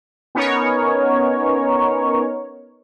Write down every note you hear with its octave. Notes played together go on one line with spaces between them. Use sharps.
B3 C#4 D#4 A#4 C#5